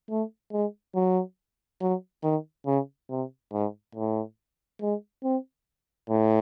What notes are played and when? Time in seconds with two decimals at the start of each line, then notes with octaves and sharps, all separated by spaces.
0.10 A3
0.52 G#3
0.95 F#3
1.81 F#3
2.23 D#3
2.66 C#3
3.10 C3
3.53 G#2
3.95 A2
4.81 G#3
5.24 C4
6.10 A2